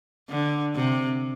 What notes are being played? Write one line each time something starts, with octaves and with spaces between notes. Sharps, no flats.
D3
C3